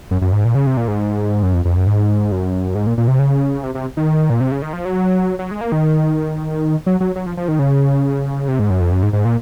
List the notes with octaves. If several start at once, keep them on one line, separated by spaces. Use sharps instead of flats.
F#2
F#2
G#2
A#2
C#3
C3
A#2
G#2
F#2
F2
F2
F#2
G#2
F#2
G#2
A#2
A#2
C3
C#3
C3
C3
D#3
A#2
C3
C#3
D#3
F3
F#3
F#3
G#3
A#3
D#3
F#3
F#3
F#3
F3
F3
D#3
C#3
C3
G#2
F#2
F2
F#2
G#2
G#2
A#2